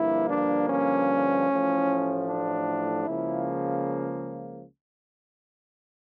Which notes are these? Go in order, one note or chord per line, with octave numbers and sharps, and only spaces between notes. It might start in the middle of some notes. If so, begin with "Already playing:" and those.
Already playing: G2 D3 F3 A#3 E4
D4
C#4
A1 A2 F3
D4
C#2 C#3 F3 A#3 E4